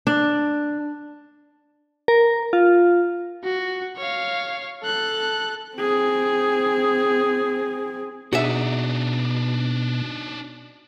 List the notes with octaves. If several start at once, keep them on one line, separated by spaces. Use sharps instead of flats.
D4
A#4
F4
F#4
C#5 F5
A4 F#6
C4 G#4
B2 D4 D#4 F#4 G#4 E5